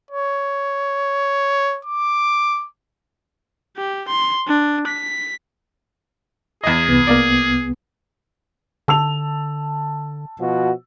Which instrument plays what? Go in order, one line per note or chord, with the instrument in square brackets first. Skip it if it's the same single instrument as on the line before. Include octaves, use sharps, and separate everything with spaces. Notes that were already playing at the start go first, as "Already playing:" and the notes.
[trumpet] C#5
D6
[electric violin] G4
C6
D4
B6
[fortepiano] E2 D#5 [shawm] G#4
[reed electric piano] C2 B3
[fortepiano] A#3 D5
[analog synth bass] D3 [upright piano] A5 E6 F7
[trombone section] B2 F3 F#4